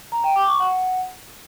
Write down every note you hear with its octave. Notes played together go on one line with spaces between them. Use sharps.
A#5
G5
D6
C#6
F#5